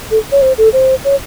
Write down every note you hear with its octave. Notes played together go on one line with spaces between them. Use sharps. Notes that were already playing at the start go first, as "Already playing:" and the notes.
A4
C#5
C5
A4
C5
C#5